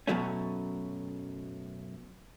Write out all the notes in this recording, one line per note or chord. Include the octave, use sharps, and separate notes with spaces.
F#2 B2 F#3 A3 C#4